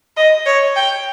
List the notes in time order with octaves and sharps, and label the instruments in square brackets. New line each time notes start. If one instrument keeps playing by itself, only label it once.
[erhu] D#5
C#5
G5